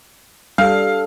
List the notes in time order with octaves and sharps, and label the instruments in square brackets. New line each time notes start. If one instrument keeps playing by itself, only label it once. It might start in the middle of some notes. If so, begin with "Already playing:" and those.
[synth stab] G3 [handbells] D4 A4 [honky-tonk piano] F5